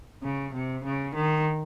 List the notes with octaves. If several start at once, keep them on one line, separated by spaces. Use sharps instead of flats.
C#3
C3
C#3
D#3